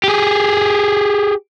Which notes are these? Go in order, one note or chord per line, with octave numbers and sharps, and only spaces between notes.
G4 G#4